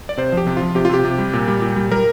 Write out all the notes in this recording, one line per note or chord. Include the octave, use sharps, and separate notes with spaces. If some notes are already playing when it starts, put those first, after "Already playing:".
D5
C3 C5
F3 G4
C3
F4
F3
C3 G4
F4
C3 G4
C3
G3
A#2
G3
A#2
G3
G3 A#4